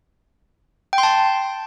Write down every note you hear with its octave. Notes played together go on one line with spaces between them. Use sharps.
G5
C6
A5